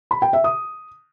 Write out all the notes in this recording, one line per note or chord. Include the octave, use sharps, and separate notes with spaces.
B5
G5
E5
D#6